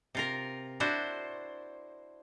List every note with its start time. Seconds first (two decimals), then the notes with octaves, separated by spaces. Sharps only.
0.15 C3 F4 A#4
0.80 D4 E4 F#4 C5